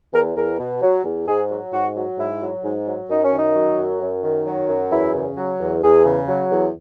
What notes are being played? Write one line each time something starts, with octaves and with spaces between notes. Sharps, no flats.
E2 A#4
E2 A#4
B2
F#3
E2
G#2 G#4
F#3
G#2 F#4
F#3
G#2 E4
F#3
G#2
F#3
F#2 D#4
C#4
D#3 D#4
F#3
F#2
F#2
D#3
F#3
F#2
E2 E4
C#3
F#3
E2
E2 G#4
C#3
F#3
E2